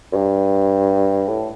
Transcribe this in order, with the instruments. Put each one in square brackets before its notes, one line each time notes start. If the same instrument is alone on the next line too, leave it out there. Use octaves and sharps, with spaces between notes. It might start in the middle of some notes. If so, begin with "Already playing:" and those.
[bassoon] F#2
G2
A2